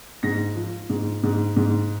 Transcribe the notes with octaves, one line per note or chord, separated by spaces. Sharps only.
G#2 A#6
F3
G#2
G#2
G#2